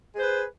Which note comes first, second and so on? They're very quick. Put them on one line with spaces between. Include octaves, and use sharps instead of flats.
G#4 C5 B4